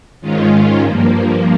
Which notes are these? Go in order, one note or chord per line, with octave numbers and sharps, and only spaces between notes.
G#2 D#3 G#3 C#4 F4
G2 F3 A#3